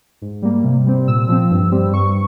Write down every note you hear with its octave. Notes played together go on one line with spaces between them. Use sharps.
G#2
G3 A#3
C3
G3 C4
A#2 E6
F3 C4
G2
G3 C4
G2 C#6